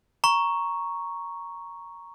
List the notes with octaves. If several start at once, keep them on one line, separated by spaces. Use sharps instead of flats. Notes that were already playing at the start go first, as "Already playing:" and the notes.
A#5 C#6